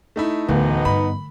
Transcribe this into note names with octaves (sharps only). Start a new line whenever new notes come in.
A3 D#4 E4
D1 D3 E3 A3 B3 D#4
G2 B5